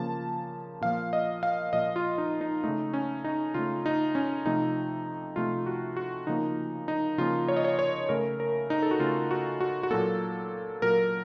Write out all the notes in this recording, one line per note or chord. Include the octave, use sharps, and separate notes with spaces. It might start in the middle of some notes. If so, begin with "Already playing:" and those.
Already playing: C#3 F3 A#3 A5
A#2 F3 A#3 F5
D#5
F5
A#2 F3 A#3 D#5
F4
D#4
D#4
C#3 A3 D#4
C#4
D#4
C#3 A3 F4
D#4
C#4
C3 F3 A3 D#4
C3 F3 A3 F4
F#4
F#4
C#3 F3 A#3 D#4
D#4
C#3 F3 A#3 F4
C#5
D#5
C#5
C#5
C#3 A3 A#4
A#4
D#4
A4
F#4
C#3 A3 F4
F#4
F#4
F#4
A#2 F#3 A#3 A4
A#2 F#3 A#3 A#4